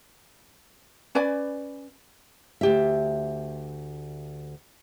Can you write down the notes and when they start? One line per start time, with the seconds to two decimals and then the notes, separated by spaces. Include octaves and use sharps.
1.15 C#4 B4 D5 G#5
2.61 D2 G4 E5